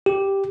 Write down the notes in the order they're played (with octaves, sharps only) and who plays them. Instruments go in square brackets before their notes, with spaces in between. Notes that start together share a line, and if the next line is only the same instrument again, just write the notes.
[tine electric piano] G4